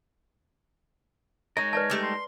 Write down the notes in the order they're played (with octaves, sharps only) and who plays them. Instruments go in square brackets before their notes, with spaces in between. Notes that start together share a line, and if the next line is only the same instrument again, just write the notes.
[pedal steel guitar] G#3 D#4 A#4 [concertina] C#5 [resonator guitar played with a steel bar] D#5
[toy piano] B4 D5 A5
[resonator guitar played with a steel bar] G3 A3 G4
[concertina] C6